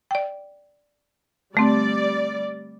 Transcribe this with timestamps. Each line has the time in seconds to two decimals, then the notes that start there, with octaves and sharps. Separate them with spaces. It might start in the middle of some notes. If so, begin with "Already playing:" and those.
0.11 D5 G5
1.55 D3 G3 A3 C4 D5